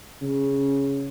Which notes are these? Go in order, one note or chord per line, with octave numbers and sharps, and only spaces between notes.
C#3